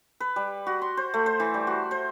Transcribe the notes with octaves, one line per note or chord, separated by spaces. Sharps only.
B4
G3
F#4
C6
C5
A3
C5
E3
G3
F#4
C5